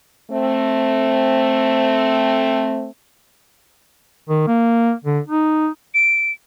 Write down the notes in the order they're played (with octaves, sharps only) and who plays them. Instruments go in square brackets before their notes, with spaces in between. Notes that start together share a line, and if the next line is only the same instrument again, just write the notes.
[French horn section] A3 C4
[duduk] D#3
A#3
D3
D#4
[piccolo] D7